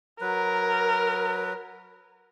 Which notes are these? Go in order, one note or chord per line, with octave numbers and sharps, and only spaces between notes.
F#3 A#4 B4